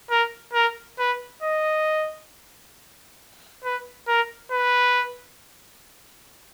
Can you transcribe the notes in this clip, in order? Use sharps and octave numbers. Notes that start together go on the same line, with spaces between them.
A#4
A#4
B4
D#5
B4
A#4
B4